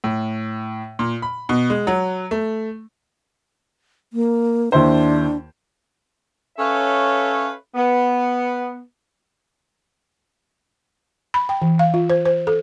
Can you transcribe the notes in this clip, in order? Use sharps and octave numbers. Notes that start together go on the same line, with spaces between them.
A2
A#2
B5
B2
G#3
F#3
A3
A#3
D#2 D4 E4 C5
C#4 A4 B4 C#5 E5 F5
B3
B5
G5
E3
F5
F4
C5
C5
A4